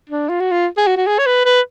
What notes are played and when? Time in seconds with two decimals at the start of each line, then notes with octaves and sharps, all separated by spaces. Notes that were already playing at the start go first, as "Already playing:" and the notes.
0.09 D4
0.29 F4
0.40 F#4
0.51 F4
0.77 G#4
0.87 F#4
0.97 F#4
1.07 G#4
1.18 C#5
1.26 B4
1.45 B4